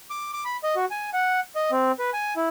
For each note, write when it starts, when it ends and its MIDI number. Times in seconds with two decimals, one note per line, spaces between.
0.10 0.31 86
0.33 0.44 86
0.45 0.57 83
0.64 0.75 75
0.76 0.85 66
0.91 1.10 80
1.13 1.40 78
1.55 1.71 75
1.71 1.92 60
1.99 2.10 71
2.13 2.34 80
2.36 2.49 64